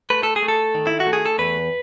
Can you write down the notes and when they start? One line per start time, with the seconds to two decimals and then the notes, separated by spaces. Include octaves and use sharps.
0.10 A3 B4
0.23 A4
0.36 G#4
0.42 A3
0.48 A4
0.75 D#3
0.87 E4
1.00 F#4
1.07 A3
1.13 G#4
1.25 A4
1.38 E2 B4